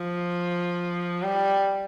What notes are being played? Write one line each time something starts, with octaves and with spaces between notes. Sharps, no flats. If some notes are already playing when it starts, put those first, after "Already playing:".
Already playing: F3
G3